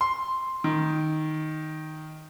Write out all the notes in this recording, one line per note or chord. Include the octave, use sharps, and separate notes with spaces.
C6
D#3